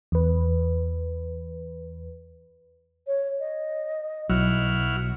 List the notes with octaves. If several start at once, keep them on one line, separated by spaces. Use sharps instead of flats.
E2 B4
C#5
D#5
B1 F#3 E4 F#4 F6